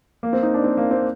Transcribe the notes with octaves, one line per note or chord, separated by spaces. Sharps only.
A#3
C4
D#4
D4
C4
A#3
C4